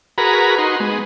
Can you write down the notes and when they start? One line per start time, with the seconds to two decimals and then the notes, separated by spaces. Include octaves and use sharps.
0.18 F#4 G#4 A#4 B4 A#5 B5
0.58 D#4 F#4 C6
0.80 G#3 B3